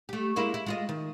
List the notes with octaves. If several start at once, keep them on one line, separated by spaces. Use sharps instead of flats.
A3 G4
G#3 A#3 E4
E4
G#3 F4 D#5
D#3